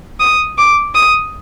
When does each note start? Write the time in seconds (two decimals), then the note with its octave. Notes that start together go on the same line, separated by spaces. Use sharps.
0.20 D#6
0.58 D6
0.95 D#6